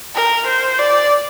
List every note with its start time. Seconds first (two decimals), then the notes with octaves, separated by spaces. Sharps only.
0.15 A#4
0.47 C5
0.79 D5